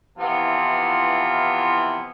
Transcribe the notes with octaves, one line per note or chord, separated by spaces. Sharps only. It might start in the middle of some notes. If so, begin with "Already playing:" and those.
C3 E3 F3 B3 E4 F4